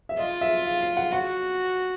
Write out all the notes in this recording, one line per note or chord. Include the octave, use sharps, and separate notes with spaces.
E5
F4 D#5
E5
F5
F5
F#5
F#4 F#5